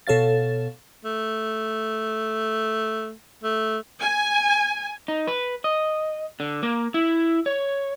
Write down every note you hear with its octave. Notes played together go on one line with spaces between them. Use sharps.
B2 A4 C#5 F5 A6
A3
A3
G#5
D#4
B4
D#5
D3
A#3
E4
C#5